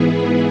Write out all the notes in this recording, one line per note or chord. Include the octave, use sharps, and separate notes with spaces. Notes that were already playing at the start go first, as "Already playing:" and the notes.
Already playing: G#2 E3 B3 E4 G#4